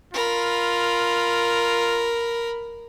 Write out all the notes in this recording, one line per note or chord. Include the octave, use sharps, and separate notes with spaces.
F4 A#4 B5